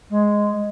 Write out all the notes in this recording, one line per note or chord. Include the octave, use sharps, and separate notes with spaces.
G#3